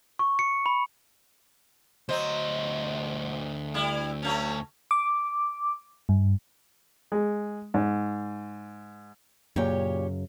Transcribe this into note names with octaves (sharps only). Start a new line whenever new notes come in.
C#6
C#7
B5
D2 F#3 C5 D#5
G3 E4
F#3 A3 C#4
D6
G2
G#3
G#2
F#2 A#2 C#3 G4 C#5